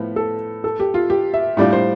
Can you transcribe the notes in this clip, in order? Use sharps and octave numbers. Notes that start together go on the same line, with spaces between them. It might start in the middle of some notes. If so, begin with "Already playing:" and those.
Already playing: A2 F3 B3
A4
A4
G4
F4
G4
E5
A2 G3 D4 F4 D5
C5